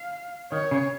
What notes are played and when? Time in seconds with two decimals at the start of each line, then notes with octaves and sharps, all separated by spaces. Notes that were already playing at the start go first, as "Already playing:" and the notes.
Already playing: F5
0.52 D#3 C#5
0.71 C#3